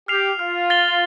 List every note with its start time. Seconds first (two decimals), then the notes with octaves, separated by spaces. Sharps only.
0.08 G4 F6 C7 F7
0.39 F4 F6
0.70 A6 C7 G7